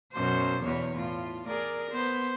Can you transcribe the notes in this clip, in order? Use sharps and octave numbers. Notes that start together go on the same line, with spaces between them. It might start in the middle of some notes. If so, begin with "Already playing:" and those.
F#2 B2 C5
E2 B2 C#5
A2 F4
G#4 A#4 D5
B3 C5